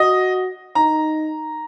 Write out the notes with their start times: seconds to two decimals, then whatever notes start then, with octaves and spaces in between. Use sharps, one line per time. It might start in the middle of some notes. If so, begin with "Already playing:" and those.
Already playing: F#4 D#5
0.75 D#4 A#5